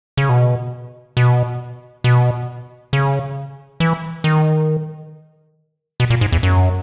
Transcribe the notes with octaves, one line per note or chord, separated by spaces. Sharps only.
C#3
B2
B2
B2
C#3
E3
D#3
B2
A#2
G#2
E2
F#2